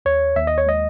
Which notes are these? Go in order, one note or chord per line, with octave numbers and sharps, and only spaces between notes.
D#2 C#5
D#2 E5
D#5
C#5
G#3 D#5